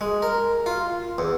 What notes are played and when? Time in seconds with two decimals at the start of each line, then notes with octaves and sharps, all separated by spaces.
0.01 G#3
0.22 A#4
0.66 F4
1.18 E2